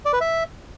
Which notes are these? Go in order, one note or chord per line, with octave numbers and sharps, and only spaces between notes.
D5
B4
E5